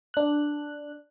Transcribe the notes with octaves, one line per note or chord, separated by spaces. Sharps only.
D4 F#6